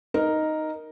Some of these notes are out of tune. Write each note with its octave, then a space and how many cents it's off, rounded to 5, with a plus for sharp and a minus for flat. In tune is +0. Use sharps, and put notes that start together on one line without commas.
D#4 +0 A#4 +0